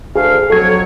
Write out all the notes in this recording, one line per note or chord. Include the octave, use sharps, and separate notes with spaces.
D2 G#4 F5
F2 F#3 A4 C#5 G#6